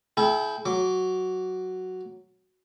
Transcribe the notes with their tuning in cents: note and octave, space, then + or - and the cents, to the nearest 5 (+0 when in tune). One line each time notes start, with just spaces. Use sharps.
E4 +0 G#4 +45 G5 +0
F#3 +0 D6 -15